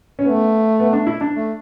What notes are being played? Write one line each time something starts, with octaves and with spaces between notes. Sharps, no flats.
C#4
A3 B3
B3
D4
E4
D4
A3